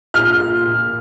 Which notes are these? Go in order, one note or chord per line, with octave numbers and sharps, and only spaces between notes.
A#2 F6
F4
A#2